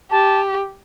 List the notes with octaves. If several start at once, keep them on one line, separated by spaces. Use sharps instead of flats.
G4 A5